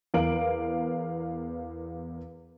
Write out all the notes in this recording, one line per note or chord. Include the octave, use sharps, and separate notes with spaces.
E2 B3 A#4 F5 D7 F#7